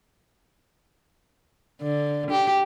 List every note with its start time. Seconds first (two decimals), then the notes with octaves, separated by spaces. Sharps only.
1.81 D3
2.31 G4